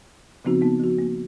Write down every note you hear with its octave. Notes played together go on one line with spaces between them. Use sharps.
C#3 F3 B3 C4 D#4 F#4
A#3 B3 D#4
F3 F#4
A#3